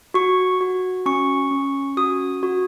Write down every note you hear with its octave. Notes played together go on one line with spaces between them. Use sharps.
F#4 C#6
F#4
C#4 C#6
C#4
F#4 D#6
F#4